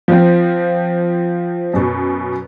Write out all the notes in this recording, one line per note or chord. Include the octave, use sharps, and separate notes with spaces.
F3 C4
F#2 B2